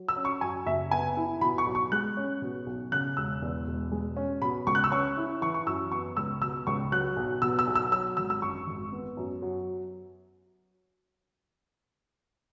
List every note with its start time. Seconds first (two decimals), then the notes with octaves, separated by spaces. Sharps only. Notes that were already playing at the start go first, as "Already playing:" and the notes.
Already playing: F#3
0.08 E6
0.16 C#4
0.25 C#6
0.41 F#2 G#5
0.66 F#1 E5
0.91 B3 G#5
1.17 E4
1.41 B2 B5
1.58 C#6
1.66 B1
1.75 C#6
1.92 G#3 F#6
2.17 C#4
2.42 B2
2.66 B1
2.92 C#3 F#6
3.17 E1 E6
3.42 E2
3.67 E1
3.92 G#3
4.17 C#4
4.42 B2 B5
4.67 C#2 C#6
4.75 F#6
4.84 E6
4.91 C#4 C#6
5.17 E4
5.42 E3 C#6
5.54 C#6
5.67 F#2 E6
5.92 B3 C#6
6.17 C#2 E6
6.41 B2 E6
6.67 C#2 C#6
6.92 F#3 F#6
7.17 B1
7.42 B2 E6
7.59 E6
7.67 B1
7.75 E6
7.92 F#3 E6
8.17 G#1 E6
8.30 E6
8.42 F#2 C#6
8.67 G#1
8.92 B3
9.17 F#2
9.42 F#3